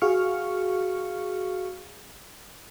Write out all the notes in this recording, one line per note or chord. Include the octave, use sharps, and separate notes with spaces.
F#4 G#4 F5 C#6 F6 C#7